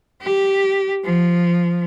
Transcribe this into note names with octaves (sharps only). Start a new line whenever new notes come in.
G4
F3